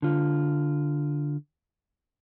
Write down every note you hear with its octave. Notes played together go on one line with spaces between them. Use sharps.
D3 F4